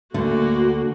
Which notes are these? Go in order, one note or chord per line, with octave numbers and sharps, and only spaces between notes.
D2 D3 A#3 F#4